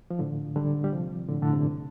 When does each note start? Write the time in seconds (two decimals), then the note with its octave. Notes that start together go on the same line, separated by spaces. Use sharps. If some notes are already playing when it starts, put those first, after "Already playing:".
0.10 F3
0.19 A2 D3
0.56 D3 G3
0.84 G3
0.92 C3 F3
1.29 A2 D3
1.42 A2 D3
1.53 G2 C3